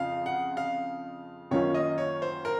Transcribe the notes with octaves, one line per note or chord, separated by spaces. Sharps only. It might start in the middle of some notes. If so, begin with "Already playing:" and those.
Already playing: F2 C#3 F3 C4 F5
F#5
F5
F#2 D#3 A#3 C#4 F4 C#5
D#5
C#5
C5
A#4